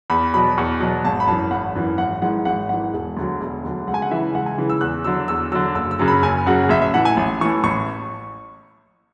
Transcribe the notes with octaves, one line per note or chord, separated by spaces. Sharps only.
E2 B5
B2 F#3 B5
E2 C#6
B2 F#3
G#1 A5
B5
F#2 E3 A5
G#1 F#5
F#2 E3
G#1 F#5
G#2 E3 F#5
G#1 F#5
G#2 E3 F#5
E1
D2 D3 F#3
E1
D2 D3 F#3
C#2 F#5
G#5
F#5
C#3 E3 E5
C#2 F#5
G#5
C#3 E3
E6
E2 F#6
D3 F#3 E6
E2 E6
D3 F#3 E6
F#1 E6
E6
F#2 C#3 F#3
B5
F#1 G#5
F#2 C#3 F#3 F#5
A1 E5
E5
A2 E3 F#5
G#5
A1
A2 E3 C#6
A1 C#6